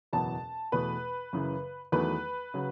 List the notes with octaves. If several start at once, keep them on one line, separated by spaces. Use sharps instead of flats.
F#1 E2 B2 F#3 B3 A5
E2 B2 A3 B4
F#2 C#3 E3
E2 D#3 F#3 A3 B4
C#3 F#3